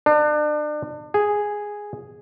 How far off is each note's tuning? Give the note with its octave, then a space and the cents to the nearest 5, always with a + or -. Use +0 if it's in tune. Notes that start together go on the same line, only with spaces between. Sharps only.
D4 +35
G#4 -5